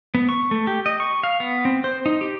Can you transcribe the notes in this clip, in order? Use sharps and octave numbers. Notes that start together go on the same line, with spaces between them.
B3
C#6
A3
G4
D#5
C#6
F5
B3
C4
C5
D#4
G4